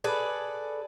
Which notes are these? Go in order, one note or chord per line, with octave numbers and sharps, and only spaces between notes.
G#4 A4 B4 D5